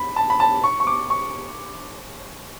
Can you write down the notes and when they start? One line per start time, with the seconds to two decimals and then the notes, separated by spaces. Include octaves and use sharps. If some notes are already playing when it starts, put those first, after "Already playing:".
Already playing: B5
0.16 A5
0.30 B5
0.40 A5
0.64 C#6
0.80 C#6
0.87 D6
1.10 C#6